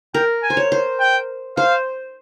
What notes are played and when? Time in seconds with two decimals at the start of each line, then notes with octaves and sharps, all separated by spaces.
0.14 A#4 G5
0.43 G#5
0.50 C5
0.57 C#5
0.72 C5
1.00 G5
1.57 C5 F5